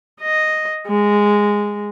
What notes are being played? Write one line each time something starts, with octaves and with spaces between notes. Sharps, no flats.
D#5
G#3